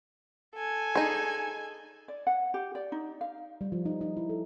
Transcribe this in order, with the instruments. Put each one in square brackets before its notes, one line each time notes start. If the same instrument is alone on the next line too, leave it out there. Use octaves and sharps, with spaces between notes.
[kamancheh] A4 G#5
[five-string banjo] D#4 G#4
[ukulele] D5
F#5
G4
D5
D#4
F5
[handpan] G3
F3
D#4
D#4
E4
A4